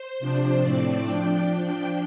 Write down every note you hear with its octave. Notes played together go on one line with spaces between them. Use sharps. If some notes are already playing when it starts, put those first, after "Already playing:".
Already playing: C5
C3 F3 D4
A2 A3 C4 D5
F3 D4 G5